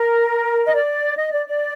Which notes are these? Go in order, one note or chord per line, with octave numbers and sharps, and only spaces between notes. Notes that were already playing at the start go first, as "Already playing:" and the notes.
Already playing: A#4
D#5
D5
D#5
D5
D5